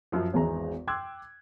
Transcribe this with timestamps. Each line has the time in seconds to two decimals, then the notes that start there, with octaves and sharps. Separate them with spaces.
0.12 F#2 F3
0.33 G#1 E2 E3 G#3 A#5
0.87 G5 C6 D6 E6 F#6 G#6